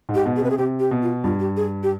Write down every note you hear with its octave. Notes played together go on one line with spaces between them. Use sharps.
G#2
G4
B2
G#4
C3 B4
G#4
C3 G4
G4
B2
F4
G2 F4
G4
G#4
G4